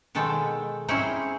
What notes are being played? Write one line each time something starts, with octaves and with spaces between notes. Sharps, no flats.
B2 D#3 G#3 A4 G5
C4 C#4 D#4 E4 G#4 C5